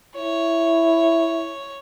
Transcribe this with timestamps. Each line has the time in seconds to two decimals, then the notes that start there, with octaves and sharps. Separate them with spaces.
0.16 E4 C#5